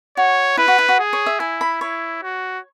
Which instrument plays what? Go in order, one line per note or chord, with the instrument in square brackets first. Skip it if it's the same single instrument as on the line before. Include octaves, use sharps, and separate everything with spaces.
[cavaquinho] F#4 [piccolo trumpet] C#5
[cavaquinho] E4 [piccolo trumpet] B4
[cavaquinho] F#4
E4
F#4
[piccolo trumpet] G#4
[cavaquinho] C#5
E5
[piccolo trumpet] E4 [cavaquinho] G#5
[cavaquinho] B5
[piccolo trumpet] E4 [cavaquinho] C#5
[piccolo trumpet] F#4